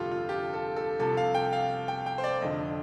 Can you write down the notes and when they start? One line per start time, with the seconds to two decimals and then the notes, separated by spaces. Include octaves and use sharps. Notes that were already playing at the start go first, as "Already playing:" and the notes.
Already playing: G1 F2 C3 G3 D4 F4 G4 A4
0.11 F4
0.29 G4
0.53 A4
0.76 A4
0.99 C2 C3 F3 A4
1.17 F5
1.35 G5
1.53 F5
1.88 G5
2.06 G5
2.18 C5
2.24 D5
2.40 F1 F2 D3 D#5